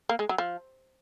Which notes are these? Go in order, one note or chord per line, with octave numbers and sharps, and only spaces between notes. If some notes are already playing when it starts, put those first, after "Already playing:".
A#3
G#3
F#3
F3